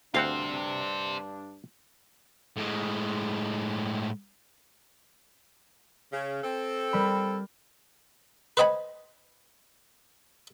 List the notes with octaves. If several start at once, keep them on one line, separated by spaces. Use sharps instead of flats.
D2 G2 C4 D4 G4 C5 F5 F#5
A2 G#3
C#3
C4 A4
G3 A#4 B5
B4 C5 D#5 G5 G#5 B5